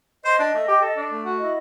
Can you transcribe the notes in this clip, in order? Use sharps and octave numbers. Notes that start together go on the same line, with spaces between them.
C5 D#5
D4
A3
G4
A4
D4
A3
F#4
E4 D#5